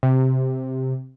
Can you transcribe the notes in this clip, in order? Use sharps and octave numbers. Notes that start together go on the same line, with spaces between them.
C3